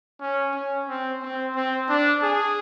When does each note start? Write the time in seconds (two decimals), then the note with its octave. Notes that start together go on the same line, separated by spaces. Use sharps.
0.21 C#4
0.54 C#4
0.89 C4
1.23 C4
1.56 C4
1.89 D4
2.23 G#4